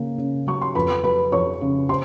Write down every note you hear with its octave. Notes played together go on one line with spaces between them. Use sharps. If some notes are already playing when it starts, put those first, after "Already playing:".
Already playing: C#3 A#3
C#3
F#3 C#6
C6
F2 B4 B5
F#3 B4 B5
F2 C#5 C#6
C#3
C5 C6